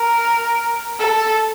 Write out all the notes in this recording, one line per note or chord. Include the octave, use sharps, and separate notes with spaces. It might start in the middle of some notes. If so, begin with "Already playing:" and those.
Already playing: A#4
A4